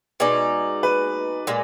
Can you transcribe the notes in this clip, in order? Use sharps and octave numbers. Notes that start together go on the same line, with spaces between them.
B2 G#3 D#4 D5
B4
A#2 G#3